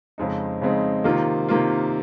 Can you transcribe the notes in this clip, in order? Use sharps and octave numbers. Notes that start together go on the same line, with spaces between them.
F2 C#3 G#3 C4 D#4
F2 C#3 G#3 C4 D#4
C3 D#3 A#3 F4
C3 D#3 A#3 F4